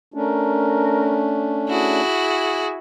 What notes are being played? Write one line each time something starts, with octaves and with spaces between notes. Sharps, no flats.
A3 C#4 D4 A#4
E4 F#4 G#4